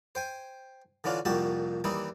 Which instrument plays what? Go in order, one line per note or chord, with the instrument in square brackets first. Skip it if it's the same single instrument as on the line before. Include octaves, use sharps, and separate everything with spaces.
[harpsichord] C5 G5 G#5
D3 E3 C#4 D4 F4
C2 F2 A#2 F#4 G4 A5
D#2 E3 G3 D#4 E4